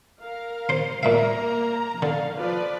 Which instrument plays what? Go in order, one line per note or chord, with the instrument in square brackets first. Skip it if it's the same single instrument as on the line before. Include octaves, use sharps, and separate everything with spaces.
[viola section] A#4 F5
[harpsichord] C5 C6
[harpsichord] A#2 E5 F5 [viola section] A#3 A#4 A#5
[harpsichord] D3 [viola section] F5
[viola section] F3 B4 D5